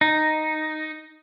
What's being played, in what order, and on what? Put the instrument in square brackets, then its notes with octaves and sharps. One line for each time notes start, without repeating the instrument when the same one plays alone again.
[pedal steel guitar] D#4